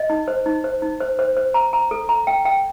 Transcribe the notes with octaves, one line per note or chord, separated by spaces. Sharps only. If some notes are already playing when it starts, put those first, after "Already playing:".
Already playing: D#5
D#4
C5
D#4
C5
D#4
C5
C5
C5
A#5
A#5
A4
A#5
G5
G5